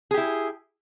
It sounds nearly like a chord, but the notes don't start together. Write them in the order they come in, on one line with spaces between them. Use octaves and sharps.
G#4 G4 E4